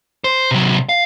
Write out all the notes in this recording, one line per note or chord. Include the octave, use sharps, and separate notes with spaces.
C5
C3 F#3
F5